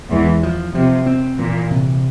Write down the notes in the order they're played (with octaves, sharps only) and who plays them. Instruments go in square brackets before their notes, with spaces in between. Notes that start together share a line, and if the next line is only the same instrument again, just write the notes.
[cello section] E2 E3 [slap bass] G#3
[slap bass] F3
[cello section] C3 [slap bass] F3
[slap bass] C4
[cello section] A#2 [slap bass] E3
[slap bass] C3